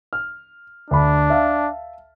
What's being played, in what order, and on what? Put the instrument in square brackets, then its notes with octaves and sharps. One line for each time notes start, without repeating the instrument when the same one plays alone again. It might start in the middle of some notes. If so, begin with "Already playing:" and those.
[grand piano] F6
[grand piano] D2 B5 [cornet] D4
[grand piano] E5 F5 A5